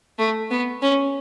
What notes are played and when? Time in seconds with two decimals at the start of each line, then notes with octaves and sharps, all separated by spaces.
0.19 A3
0.50 B3
0.82 C#4